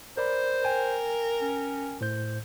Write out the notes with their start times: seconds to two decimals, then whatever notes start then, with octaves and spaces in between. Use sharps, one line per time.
0.17 A#4 C5 D5 B5
0.65 A#4 G5 G#5
1.41 C#4
2.01 A2 C5 G6